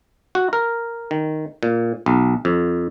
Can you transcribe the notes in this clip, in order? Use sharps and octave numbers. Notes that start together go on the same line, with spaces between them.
F#4
A#4
D#3
A#2
B1
F2